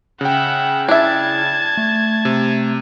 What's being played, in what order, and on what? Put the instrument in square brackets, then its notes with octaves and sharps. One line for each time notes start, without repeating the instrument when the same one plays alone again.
[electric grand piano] C#3 G5 [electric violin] E5 F#5
[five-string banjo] D4 E5 [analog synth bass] E4 [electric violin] A5 G#6
[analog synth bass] A3
[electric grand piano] C3